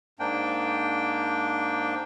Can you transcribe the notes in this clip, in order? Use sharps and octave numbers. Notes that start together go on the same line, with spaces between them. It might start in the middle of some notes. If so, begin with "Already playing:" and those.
G#2 A#3 D4 G5